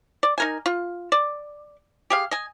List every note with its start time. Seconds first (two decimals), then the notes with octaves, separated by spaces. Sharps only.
0.23 D5
0.38 D#4 A#4 G#5
0.66 F4
1.12 D5
2.10 G4 G#4 F5
2.31 D#5 G#5